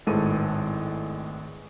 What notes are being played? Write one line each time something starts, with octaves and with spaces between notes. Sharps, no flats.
G#1 A2 G#3 A4 B4 D#7